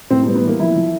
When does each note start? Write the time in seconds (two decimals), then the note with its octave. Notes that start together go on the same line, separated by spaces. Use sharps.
0.10 A2 C4
0.23 B3
0.26 G3
0.35 B3
0.44 E3 A#3
0.60 F3 E4
0.76 F3